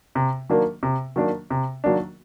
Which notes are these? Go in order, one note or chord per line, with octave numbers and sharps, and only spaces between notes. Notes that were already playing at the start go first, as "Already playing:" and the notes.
C3
D#3 F#3 A#3 D4
C3
D#3 F#3 A#3 D4
C3
D#3 F#3 A#3 D4